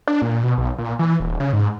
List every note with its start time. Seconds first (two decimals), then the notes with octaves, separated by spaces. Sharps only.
0.08 D4
0.22 A#2
0.43 B2
0.58 B1
0.79 A#2
0.99 E3
1.20 D#1
1.40 C#3
1.53 G#2